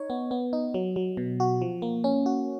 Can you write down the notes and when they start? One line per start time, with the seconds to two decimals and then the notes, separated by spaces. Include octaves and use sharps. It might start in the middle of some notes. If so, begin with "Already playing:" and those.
Already playing: D#4 C#5
0.10 B3
0.31 B3
0.53 D#4
0.74 F#3
0.96 F#3
1.17 B2
1.40 F#4
1.62 F3
1.82 A#3
2.04 C#4
2.26 F#4